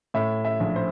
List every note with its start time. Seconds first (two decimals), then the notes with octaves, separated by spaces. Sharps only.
0.14 A2 E5
0.45 E5
0.60 A#1
0.76 C5